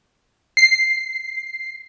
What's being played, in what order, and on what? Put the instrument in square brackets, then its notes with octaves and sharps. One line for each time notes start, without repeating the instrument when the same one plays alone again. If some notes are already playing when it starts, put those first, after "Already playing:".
[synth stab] C7